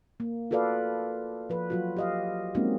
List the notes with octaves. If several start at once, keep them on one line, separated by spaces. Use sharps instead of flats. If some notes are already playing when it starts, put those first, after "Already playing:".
A#3
F4 F#4 A4 B4 D5 F5
F3 B4
F#3 F4 F#4
G4 D#5 F5
G#3 A#3 C4 C#4 D#4 F#4